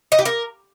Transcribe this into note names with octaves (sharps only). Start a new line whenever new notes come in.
D#5
G4
A#4